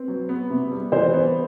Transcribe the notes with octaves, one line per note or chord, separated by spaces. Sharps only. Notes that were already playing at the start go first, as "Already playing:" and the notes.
Already playing: C4 B4
F#3
B3
C3
G3
E3 C5
B3